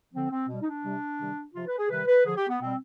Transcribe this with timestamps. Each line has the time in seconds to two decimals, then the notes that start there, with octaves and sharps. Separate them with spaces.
0.13 D3 F3 C4
0.31 C4
0.48 B2 G3
0.62 D#4
0.66 D4
0.84 C3 G3
1.19 C3 D#3 G3
1.54 C3 F3 F4
1.67 B4
1.78 G#4
1.89 C3 D#3 G3 B4
2.07 B4
2.25 D3 F3 G#4
2.36 G4
2.48 B3
2.61 B2 G3 C4